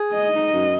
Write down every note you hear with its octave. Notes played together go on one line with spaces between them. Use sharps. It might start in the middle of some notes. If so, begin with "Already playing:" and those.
Already playing: G#4
G#3 D#5
D#4
F#2